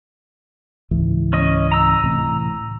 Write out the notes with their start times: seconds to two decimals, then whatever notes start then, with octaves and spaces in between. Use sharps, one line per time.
0.91 C#2 G#2 E3
1.33 C#4 D#5
1.72 A#5 E6
2.04 A2 C3 E3